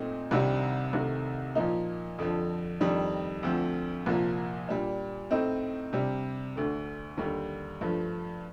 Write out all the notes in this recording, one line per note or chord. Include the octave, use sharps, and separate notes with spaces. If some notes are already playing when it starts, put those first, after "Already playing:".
Already playing: A#2 A3 C4 D#4
C2 C3 D#3 G3 D4
C2 C3 D#3 A3
A#2 F3 A#3 D#4
F2 D3 F3
F2 D#3 G3 D4
D2 D3 F3 C4
C2 A#2 F3 A#3
A#2 G3 D4
A2 A3 C4 D#4
C3 G3 D4
D2 D3 A3
D#2 D3 G3
G2 F3 A3